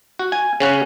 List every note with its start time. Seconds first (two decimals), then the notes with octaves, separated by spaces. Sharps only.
0.19 F#4
0.32 G#5
0.60 C#3 C#4 F#5